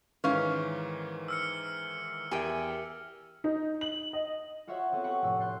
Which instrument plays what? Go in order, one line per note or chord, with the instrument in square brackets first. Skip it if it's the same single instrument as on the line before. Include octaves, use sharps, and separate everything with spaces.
[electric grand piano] G#2 D#3 E3 [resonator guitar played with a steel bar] C#4 F5 [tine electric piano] B4
[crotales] E6 F6 C#7
[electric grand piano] E2 [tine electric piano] G4 A#4 E5 [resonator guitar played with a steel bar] G5 G#5
[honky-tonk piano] D#4
F#7
D#5
[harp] F4 F#4 C5 C#5 E5 F#5
B3 C4 A4
G4 A4 F#5 B5 C#6
F1 A2 A3 E6
C6 F#6 G6 A6 C7